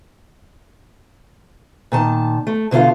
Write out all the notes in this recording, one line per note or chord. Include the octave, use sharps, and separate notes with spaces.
A#2 D#3 A5
A3
B2 D3 D4 F4 F5